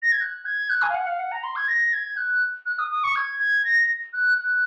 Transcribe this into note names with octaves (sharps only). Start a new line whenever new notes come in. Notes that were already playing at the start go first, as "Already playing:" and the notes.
A#6
G#6
F#6
G#6
F#6
G#5
F5
F#5
F5
F#5
A#5
C6
G#6
A#6
G#6
F#6
F#6
D#6
D#6
C#6
G#6
G#6
A#6
F#6
F#6